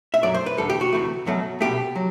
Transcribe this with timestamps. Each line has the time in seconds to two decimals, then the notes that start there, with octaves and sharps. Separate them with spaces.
0.14 E5
0.23 F#2 F#3 A3 D5
0.34 C5
0.46 B4
0.57 E2 D3 G3 A4
0.70 G4
0.81 F#4
0.93 D2 C3 E3 A3
1.26 B1 B2 F#3 A3
1.61 C2 B2 A3 G4
1.96 F#3